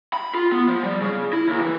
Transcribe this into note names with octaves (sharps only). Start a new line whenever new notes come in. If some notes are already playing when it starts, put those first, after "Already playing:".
B5
F4
B3
F3
G3
C#3
E4
D#2
E3